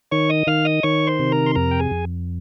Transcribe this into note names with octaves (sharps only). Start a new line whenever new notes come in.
D#3 C#5 C#6
D#5 D#6
D#3 F5 F6
D#5 D#6
D#3 C#5 C#6
C5 C6
C3
A#4 A#5
C6
F2 A#4 A#5
G5
G#4 G#5
F2